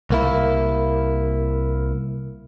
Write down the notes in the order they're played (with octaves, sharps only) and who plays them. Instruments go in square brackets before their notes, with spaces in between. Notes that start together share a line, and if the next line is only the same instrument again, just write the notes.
[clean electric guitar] C2 A#3 E4